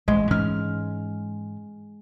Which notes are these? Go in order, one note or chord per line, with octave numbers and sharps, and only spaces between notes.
A1 G#3
G#2 E3 C#4 F6